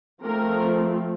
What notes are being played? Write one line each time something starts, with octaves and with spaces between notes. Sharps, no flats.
F3 A3 C4 A#4